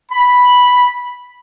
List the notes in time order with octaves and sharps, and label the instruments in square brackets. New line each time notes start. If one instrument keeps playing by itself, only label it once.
[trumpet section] B5